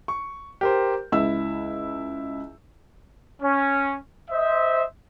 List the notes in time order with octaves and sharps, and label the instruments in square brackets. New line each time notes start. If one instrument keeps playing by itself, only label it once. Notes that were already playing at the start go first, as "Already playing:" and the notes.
[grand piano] C#6
G4 A#4 C5
[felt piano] C#2 E5 E6 [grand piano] E4
[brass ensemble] C#4
C5 D#5 E5